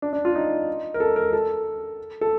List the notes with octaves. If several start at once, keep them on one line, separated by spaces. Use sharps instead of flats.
D4
D4
F4
D#4
A#4
A4
A#4
A4
A4